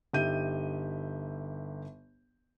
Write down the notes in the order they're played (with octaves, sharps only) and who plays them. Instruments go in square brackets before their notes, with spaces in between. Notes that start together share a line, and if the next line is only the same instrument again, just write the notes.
[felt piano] G1 D#4 G4 E5 G6 D#7